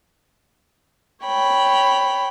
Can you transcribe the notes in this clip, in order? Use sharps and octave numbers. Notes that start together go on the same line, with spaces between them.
C#5 G5 B5